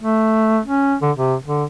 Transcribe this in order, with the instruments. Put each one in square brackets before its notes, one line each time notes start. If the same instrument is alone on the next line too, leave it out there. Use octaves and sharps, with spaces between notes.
[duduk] A3
C#4
D3
C3
D3